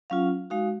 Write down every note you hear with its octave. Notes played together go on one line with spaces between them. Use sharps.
F#3 C#4 F4 F5
G#3 D#4 F#4 F5